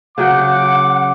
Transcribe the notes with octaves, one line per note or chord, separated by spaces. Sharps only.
C#3 F#3 F#5 G5 D6